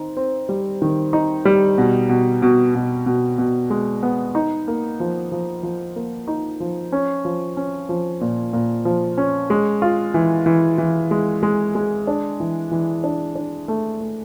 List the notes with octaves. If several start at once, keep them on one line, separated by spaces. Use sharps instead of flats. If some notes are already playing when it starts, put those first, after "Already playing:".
Already playing: D#3 C4 D#4
C4
G3
D#3
D#4
G3
B2
B2
B2
B2
B2
B2
G#3
B3
D#4
A#3
F3
F3
F3
A#3
D#4
F3
C#4
F3
C#4
F3
A#2
A#2
F3
C#4
G#3
F4
E3
E3
E3
G#3
G#3
G#3
D4
E3
E3
D4
D4
A3
A3